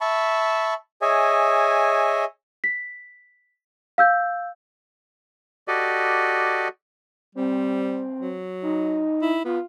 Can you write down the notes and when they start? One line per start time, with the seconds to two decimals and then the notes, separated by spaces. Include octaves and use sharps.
0.01 E5 A5 B5 C#6
1.02 G#4 C#5 D#5 E5 G#5
2.64 B6
3.98 F5 E6 G6
5.68 F#4 G4 A4 D5 D#5
7.35 G3 C4
8.21 F#3
8.62 D#4
9.22 E4
9.45 B3 F4